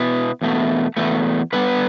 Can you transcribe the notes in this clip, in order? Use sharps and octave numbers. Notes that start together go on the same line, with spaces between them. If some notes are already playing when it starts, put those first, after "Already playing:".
Already playing: B2 B3 E4
E2 B2 A3
E2 B2 A3
D3 G3 B3 B4